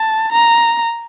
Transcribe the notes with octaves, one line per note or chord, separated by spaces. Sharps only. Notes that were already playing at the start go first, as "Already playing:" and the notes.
Already playing: A5
A#5